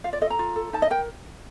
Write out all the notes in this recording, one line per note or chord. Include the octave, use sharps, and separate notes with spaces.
F4 F5
D5
A4 D#5
A#5
F4
A4
D#4 A5
D#5
A#4 G5